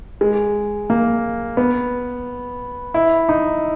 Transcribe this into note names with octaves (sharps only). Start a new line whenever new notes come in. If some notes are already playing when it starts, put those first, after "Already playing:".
G#3
A#3
B3
E4
D#4